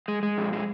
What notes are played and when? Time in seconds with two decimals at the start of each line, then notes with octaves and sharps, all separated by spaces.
0.08 G#3
0.23 G#3
0.38 F2
0.53 G#3